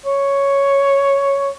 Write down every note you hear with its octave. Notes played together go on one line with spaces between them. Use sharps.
C#5